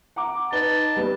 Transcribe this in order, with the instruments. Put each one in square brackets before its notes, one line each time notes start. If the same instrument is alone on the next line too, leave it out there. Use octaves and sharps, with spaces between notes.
[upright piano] F#5 A#5 D6
[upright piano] D#4 B4 G7 [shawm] A5
[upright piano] G3 B3 B4